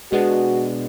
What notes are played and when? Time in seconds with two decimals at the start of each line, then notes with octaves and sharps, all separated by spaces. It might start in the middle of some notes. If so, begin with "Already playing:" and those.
0.12 B2 G#3 B3 D4 F#4